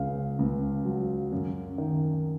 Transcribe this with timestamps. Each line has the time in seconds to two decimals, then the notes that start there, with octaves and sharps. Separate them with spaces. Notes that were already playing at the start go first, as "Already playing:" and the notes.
Already playing: C#2 C#3 F5
0.39 C#2
0.85 F#3
1.32 F#2
1.78 D#3